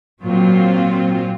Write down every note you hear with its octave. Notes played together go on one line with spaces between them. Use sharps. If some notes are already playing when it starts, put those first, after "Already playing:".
A#2 F#3 C4 F4